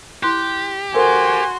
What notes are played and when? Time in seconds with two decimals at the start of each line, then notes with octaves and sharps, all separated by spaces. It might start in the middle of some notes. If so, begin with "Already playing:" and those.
0.23 E4 G4 C6 F#6
0.95 F#4 A4 A#4 C5 G#5 C6